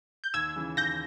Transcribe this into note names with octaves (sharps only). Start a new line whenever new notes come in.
G6
D#2 E6 G#6
C#3 E3
D#2 G6 A#6